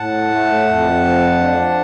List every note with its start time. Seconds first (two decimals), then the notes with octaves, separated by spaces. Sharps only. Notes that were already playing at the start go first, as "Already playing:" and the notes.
Already playing: A2 F#5 A5
0.29 A3
0.67 F2
1.04 F3
1.40 D4